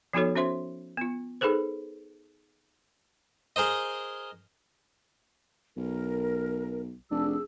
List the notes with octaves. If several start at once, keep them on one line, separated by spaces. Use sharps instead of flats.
F3 B3 D#4 F#4 A4 C#5
C#4 F#4 C5 E5 C6
B3 F4
D#4 G#4 A4 B4 C5
G#4 A#4 C5 D#5
B1 A#4
F1 D4 G#4 E6